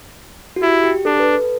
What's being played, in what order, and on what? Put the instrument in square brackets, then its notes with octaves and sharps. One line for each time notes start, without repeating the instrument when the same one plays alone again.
[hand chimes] F#4
[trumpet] E4 [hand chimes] G4
[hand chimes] G4
[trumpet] D4 [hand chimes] A4
[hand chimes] B4
A4